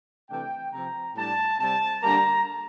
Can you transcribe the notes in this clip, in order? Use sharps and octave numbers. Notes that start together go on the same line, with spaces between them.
C3 E3 A3 D4 G5
C3 F3 C4 A#5
A2 G3 D4 A5
C3 G3 C4 A5
D3 G3 A#3 A#5